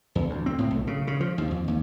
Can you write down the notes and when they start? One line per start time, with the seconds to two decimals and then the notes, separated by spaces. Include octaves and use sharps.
0.15 E2
0.30 D2
0.46 C4
0.58 A2
0.71 B1
0.87 C#3
1.07 C#3
1.20 F3
1.38 D#2
1.51 F2
1.68 D#2